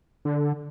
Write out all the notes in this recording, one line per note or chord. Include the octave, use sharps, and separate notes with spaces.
D3